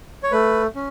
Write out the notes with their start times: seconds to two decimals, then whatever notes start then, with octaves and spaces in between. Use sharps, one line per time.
0.23 C#5
0.32 A3 B4
0.75 C#4